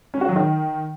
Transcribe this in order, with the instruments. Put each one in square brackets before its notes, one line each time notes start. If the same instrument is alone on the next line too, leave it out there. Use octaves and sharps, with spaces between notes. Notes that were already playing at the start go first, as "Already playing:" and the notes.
[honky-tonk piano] C#4
F#4
F#3
D#3